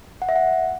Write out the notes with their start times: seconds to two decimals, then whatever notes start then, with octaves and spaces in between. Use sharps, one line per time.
0.22 F#5
0.29 E5
0.36 F#5